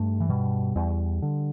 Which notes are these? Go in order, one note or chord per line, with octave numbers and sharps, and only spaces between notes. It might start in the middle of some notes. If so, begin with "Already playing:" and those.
Already playing: G2 A3
E3
B2 G3
E2
D3